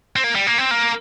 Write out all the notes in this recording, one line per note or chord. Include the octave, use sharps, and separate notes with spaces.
C4
A#3
G3
A#3
C4
A#3